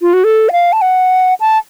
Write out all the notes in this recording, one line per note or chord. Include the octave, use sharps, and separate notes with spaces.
F4
F#4
A4
F#5
F5
A5
F#5
A5